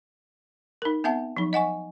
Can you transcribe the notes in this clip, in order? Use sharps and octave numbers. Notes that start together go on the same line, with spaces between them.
D#4 A#4
B3 C4 E5 F#5 A5
F3 F#3 D#4
D#5 F#5 G#5 C#6